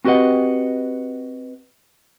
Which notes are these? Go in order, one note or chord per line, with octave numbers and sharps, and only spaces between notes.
C4 F#4 G4 B4 D#5 F#5